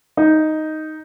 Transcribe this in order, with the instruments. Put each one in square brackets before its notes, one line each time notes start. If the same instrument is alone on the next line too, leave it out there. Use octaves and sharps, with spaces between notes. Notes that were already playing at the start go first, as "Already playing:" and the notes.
[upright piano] D#4